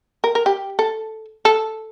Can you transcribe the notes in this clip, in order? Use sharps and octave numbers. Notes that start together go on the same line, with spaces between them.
A#4
A#4
G4
A4
A4